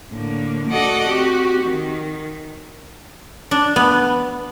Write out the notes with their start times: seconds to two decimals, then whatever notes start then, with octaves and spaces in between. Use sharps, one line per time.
0.12 A2 D3 A#3
0.70 F#4 A4 D5 D#5 F#5 D6
1.07 C4 F#4 G4
1.60 D#3
3.51 D4
3.76 B3